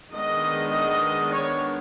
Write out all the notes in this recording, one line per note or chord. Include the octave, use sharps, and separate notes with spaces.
D#3 G#3 B3 D4 D#5
D#5
C#5